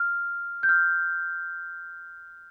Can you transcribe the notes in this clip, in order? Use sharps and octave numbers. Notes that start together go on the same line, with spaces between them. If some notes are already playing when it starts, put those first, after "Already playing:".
Already playing: F6
G6
F6